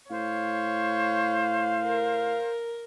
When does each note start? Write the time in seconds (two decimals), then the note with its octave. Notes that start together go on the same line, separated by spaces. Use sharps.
0.11 A2 C5 C#5 F5
1.84 A#4